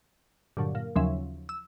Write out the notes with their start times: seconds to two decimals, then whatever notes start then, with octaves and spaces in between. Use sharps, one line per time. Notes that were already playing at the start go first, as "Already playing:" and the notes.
0.57 G2 A#2 D3 F#3
0.75 A#2
0.96 D#2 C#3 F3 F#3 C#4 E5
1.49 E6